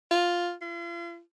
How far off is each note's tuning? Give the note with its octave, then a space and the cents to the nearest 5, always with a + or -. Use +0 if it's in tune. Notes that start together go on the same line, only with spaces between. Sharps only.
F4 +5
F4 -40